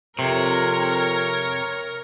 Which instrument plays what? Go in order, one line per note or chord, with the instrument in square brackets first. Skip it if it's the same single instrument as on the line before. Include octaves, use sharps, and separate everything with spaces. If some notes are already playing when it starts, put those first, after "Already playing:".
[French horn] F2 [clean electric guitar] C3 [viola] A#4 [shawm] C#5